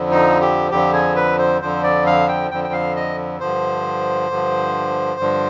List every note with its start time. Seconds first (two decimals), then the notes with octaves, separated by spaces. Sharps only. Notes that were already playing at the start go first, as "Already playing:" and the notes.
Already playing: F2 D3 F3
0.11 D#4
0.41 G4
0.71 F2 D3 F3 G4
0.93 G#4
1.16 B4
1.39 C5
1.61 F2 D3 F3 C5
1.83 D5
2.07 F5
2.28 G5
2.50 F2 D3 F3 G5
2.64 G5
2.73 F5
2.96 D#5
3.40 G2 D3 F3 C5
4.31 G2 D3 F3
5.20 G2 D3 F3